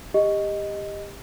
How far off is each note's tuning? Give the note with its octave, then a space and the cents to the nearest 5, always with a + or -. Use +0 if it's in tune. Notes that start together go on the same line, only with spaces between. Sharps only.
G4 +25 D#5 +0